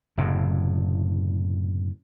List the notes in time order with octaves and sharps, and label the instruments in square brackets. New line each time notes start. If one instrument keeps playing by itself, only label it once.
[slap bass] F#1 F#2 A2 C3